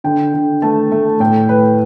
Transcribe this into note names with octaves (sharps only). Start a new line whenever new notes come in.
D3 G5
D3
A3 A5
A3
A2 G5
A2 B4